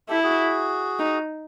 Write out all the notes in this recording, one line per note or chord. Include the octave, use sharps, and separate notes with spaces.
E4 G4 A4
F#4 G#4
D#4